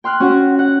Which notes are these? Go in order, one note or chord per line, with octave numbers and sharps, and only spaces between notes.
G5 C6 F6 F#6
C#4 F#4 F#5
F#5